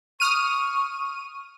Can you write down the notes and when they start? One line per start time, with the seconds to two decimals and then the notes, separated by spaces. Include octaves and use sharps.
0.20 C#6 D#6 F6 D#7